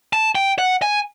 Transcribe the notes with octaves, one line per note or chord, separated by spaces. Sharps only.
A5
G5
F#5
G#5